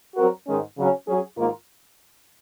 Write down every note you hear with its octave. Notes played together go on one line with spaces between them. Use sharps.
F#3 C4 F#4 A#4
G#2 D#3 G#3 C#4
C#3 F#3 C#4
F#3 C#4 G#4
G#2 D#3 A#3 F4 A#4